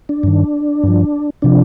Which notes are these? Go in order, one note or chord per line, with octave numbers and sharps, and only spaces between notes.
D4
G2 D#3
G2 F3
C3 F3 D4